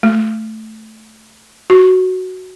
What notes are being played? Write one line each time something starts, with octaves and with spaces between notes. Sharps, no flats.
A3
F#4